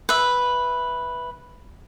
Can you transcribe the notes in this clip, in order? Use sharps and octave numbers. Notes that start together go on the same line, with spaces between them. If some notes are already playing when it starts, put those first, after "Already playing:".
B4 E5